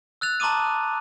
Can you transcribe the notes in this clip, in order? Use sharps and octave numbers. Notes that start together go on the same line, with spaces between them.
E6 F#6 A6 F7
A5 A#5 C6 D6 D#6 D#7